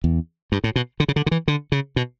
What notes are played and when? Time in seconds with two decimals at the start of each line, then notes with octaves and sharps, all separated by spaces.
0.04 E2
0.52 G2
0.64 A2
0.76 B2
1.00 D3
1.08 C#3
1.16 D3
1.26 D3
1.31 E3
1.48 D3
1.72 C#3
1.96 B2